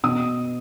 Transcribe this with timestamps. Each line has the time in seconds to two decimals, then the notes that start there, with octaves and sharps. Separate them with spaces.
0.04 B2 D#6